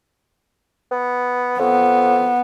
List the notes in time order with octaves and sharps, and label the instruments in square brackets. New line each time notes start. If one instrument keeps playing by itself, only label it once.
[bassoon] B3
[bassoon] F2 [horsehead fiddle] B3